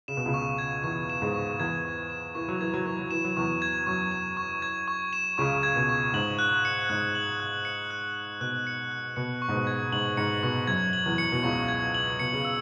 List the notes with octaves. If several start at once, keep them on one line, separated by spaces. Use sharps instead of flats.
C#3 E7
B2
C#2 C#3
C#6
G#6
E2 E3 C#6
E7
G#2 G#3
C#6
E2 E3 G#6
C#6
E7
E3 C#6
F#3
E3 G#6
F#3
E3 C#6
F#3
E3 E7
F#3
E2 E3 C#6
G#6
F#2 F#3 C#6
E7
C#6
G#6
C#6
E7
C#2 C#3 C#6
G#6
B2
C#6
G#2 F#7
F#6
C#7
G#2 F#6
F#7
F#6
C#7
F#6
F#7
B2 F#6
C#7
F#6
B2 C#7
C#6
G#2
B2
G#6
G#2 F#7
G#2 C#7
B2 C#6
F#2 F#3 G#6
F#7
E2 E3
C#7
B2
C#2 C#3 C#6
G#6
F#7
B2 C#7
C#3
E6